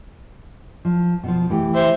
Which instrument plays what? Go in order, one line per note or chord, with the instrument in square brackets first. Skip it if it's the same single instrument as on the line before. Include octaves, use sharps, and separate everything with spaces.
[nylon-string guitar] F3
B2 D3 F3
E3 A3 G4
[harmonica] C5 E5